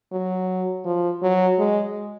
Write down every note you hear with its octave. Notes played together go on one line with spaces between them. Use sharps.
F#3
F3
F#3
G#3